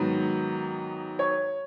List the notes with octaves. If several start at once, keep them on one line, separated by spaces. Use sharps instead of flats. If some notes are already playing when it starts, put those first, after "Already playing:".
Already playing: G#2 D#3 F#3 B3
C#5